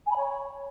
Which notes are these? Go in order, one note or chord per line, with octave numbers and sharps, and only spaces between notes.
G#5
B5
C#5